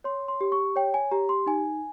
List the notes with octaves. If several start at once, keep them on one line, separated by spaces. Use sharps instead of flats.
C#5 C6
C6
G4
C#6
C#5 G5
G#5
G4 A#5
C6
D#4 G#5